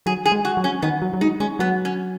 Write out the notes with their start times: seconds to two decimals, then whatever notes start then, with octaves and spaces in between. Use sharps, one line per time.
0.06 F#3 G#4
0.25 G#4
0.32 G#3
0.45 F#4
0.57 F#3
0.64 C#4
0.82 D#3 B3
1.02 F#3
1.14 F#3
1.21 G#3 D#4
1.40 G#3 C#4
1.59 F#3 B3
1.85 C#4